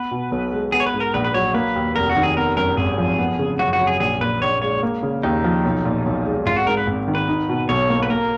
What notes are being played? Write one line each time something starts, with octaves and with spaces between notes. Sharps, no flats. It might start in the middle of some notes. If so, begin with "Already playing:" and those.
Already playing: B3 B4
B2
B1
G#3
B3 G#4
C#5
B4
G#2
A#4
A#1 B4
B4
F#3 C#5
A#3 B4
D#2
F1 A#4
F#4
D#3
G#4
B3 A#4
F#2 A#4
G#1 G#4
F3
B3
C#3
F#2 F#4
F#4
F#3
G#4
A#1 G#4
A#2 B4
A#1 C#5
G#3 C#5
A#3
C#3
D#2 D#4
F3
B1
A#2
B1
G#3
G#1 F4
F#4
G#2 A#4
B4
G#1
D#3
B4
D#4
B2
B1 C#5
A#3
B4
A#3 A#4